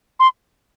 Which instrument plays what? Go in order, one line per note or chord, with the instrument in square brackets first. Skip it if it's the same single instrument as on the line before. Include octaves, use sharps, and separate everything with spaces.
[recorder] C6